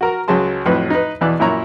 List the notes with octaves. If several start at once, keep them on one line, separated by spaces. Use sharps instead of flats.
F#4 A#4 A#5
C#2 F#3 G#4 A5 C6
F2 A2 F#3 B4 B5
D#4 B4
E2 B2 E3 B3 D5 F#6
F#2 A#2 E4 C#5 A#5 C#6